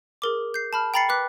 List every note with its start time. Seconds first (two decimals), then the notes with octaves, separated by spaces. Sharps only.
0.22 G#4 A#4 D6
0.54 G6 C7
0.73 A5 B5 F6
0.94 G5 A#5 B5 A6 C7 C#7
1.09 B4 D6 F#6 B6